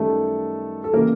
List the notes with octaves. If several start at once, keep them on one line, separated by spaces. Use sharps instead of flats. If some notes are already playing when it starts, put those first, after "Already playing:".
Already playing: F#2 D#3 G3 A3 A4
A4
C#3 E3 G3 A#3 A#4